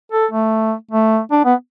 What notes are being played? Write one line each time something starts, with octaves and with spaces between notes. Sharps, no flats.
A4
A3
A3
D4
B3